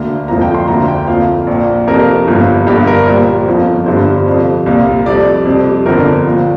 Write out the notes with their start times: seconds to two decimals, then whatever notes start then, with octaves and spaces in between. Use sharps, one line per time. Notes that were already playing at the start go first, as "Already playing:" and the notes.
Already playing: D2 D3 A#3
0.28 F1 F2 F3 A#3 A#5
0.41 G5
0.55 C6
0.67 D2 D3 A#3 A#5
0.88 G5
1.07 F2 F3 A#3 F5
1.47 A#1 A#2 A#3
1.87 F2 C3 A#3 A#4
2.28 G1 G2 F3 A#3
2.67 G1 G2 D3 A#3 G4
2.87 A#4
3.06 A#1 A#2 G3 A#3 C5
3.47 G1 F2 F3 A#3
3.86 G1 G2 D3 G3 A#3 C5
4.27 F2 C3 F3
4.66 C2 A#2 A#3
5.06 F2 C3 G3 D5
5.45 F2 C3 G3
5.86 G1 F2 D3 A#4
6.26 A#1 A#2 F3